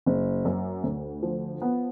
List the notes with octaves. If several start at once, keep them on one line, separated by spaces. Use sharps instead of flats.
F#1
F#2
D2
F3
B3